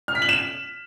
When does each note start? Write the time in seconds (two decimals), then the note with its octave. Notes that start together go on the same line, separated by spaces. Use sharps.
0.08 F6
0.15 B6
0.22 F#7
0.29 E7